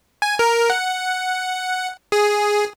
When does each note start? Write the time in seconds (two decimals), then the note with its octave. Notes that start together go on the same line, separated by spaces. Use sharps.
0.22 G#5
0.39 A#4
0.70 F#5
2.12 G#4